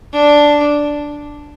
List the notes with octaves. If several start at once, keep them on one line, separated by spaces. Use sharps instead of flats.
D4